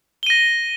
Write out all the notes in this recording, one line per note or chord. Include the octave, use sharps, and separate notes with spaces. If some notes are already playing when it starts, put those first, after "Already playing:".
A#6 D#7 G7